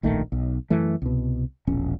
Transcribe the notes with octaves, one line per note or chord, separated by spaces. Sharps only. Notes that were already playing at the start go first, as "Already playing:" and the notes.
D1 A#1 D#3 A3
B1
F#2 E3 A3
C2 B2
E1 A#1 C#4